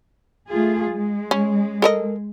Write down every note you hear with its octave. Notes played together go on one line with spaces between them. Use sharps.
A3 F4 G#4
G#3
C#4
A4 A#4 D#5